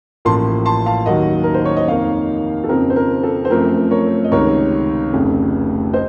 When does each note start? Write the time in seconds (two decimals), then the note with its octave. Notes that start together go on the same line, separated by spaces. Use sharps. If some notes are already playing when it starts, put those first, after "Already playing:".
0.25 A1 A2 F3 A#3 A5 C6
0.66 A5 C6
0.86 F5 A5
1.06 D#2 D#3 F#3 D#5 F#5
1.43 A#4
1.54 C5
1.65 C#5
1.77 D#5
1.87 F2 D#3 A#3 C#5 F5
2.64 A4
2.69 F2 C#3 F3 C4 A#4
2.90 C5
2.96 A#4
3.23 A4
3.45 C5
3.50 F#2 F3 A3 C4 A#4
3.91 A#4 C#5
4.24 D#5
4.32 C#2 C3 D#3 A#4 C#5
5.13 F1 F2 C#3 A3
5.93 C5 D#5